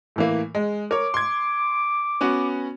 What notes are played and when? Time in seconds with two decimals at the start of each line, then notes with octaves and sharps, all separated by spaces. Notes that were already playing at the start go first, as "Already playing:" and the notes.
0.16 A2 E3 A#3
0.55 G#3
0.91 A#4 C#5 D6
1.14 C6 G#6
2.21 B3 C#4 F#4